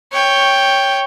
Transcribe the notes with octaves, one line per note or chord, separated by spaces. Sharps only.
C#5 G5